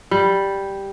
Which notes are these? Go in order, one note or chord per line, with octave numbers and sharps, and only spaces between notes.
G3